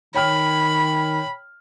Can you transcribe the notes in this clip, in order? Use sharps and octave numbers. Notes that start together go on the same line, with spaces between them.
D#3 C#5 G5 B5 F6